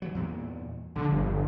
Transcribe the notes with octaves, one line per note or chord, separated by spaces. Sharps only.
E3 F#3
E2 G2 A#2
A#1 D3
G1